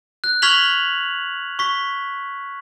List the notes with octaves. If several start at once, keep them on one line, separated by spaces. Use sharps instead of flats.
F#6
C#6 F6 G#6 B6 F7 F#7
C#6 B6